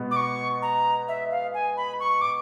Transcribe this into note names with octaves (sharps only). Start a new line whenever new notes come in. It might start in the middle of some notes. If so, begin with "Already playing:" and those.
Already playing: B2 G#3 B3
D6
C#6
A#5
E5
F5
G#5
B5
C#6
D6